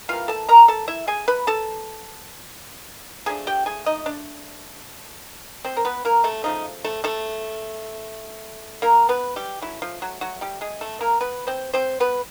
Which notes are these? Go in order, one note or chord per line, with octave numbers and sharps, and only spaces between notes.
C#3 E3 G3 A#3 F4 F5
A4 A5
A#4 A#5
A4 A5
E4 E5
G#4 G#5
B4 B5
A4 A5
F3 A3 D4 G#4 G#5
G4 G5
G#4 G#5
D#4 D#5
D4 D5
C4 C5
A#4
B3 B4
A#3 A#4
A3 A4
C#3 F3 A3 D#4
A3 A4
A3 A4
A#3 A#4
B3 B4
G3 G4
F#3 A3 C#4 E4
F3 F4
F#3 F#4
F#3 F#4
G3 G4
G#3 G#4
A3 A4
A#3 A#4
B3 B4
C4 C5
C4 C5
B3 B4